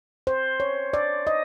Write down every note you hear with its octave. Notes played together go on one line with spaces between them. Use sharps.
C5
C#5
D5
D#5